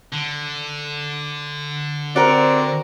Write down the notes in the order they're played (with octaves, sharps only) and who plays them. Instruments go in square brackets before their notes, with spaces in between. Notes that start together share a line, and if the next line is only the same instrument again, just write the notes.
[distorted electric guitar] D3
[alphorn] C4 [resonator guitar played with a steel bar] F#4 A#4 [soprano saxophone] D5